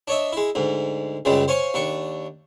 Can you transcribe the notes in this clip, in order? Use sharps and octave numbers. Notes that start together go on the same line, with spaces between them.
D4 C#5 D#5 E5
G#3 E4
D2 G#2
C#2 F#2 C#3 G3 G#3
C5 C#5 F5 G#5 C6 C#6
D#2 D4 C#6